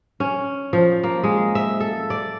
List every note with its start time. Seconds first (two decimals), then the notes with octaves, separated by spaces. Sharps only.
0.20 C#4
0.73 F3
1.03 A#3
1.23 G#3
1.55 E5
1.80 A4
2.10 D5